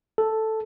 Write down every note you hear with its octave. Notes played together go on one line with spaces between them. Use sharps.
A4